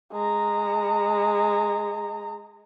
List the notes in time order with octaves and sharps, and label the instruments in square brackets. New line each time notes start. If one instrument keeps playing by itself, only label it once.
[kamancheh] G#3 A#5